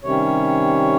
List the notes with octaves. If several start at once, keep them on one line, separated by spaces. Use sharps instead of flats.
C3 D#3 G3 C#4 C#5